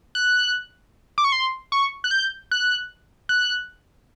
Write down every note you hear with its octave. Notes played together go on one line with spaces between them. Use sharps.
F#6
D6
C#6
C6
C#6
F#6
G6
F#6
F#6